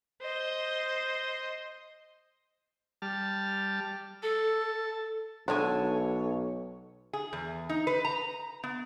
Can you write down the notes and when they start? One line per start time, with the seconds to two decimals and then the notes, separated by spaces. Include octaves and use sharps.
0.22 C5 D#5
3.02 G3 A5 F6
4.23 A4 A5
5.48 B1 G#3 D4 F#4 A4 C#5 G#5
7.13 G#4
7.33 E2
7.69 D#4
7.87 B4
8.05 A#5
8.64 B3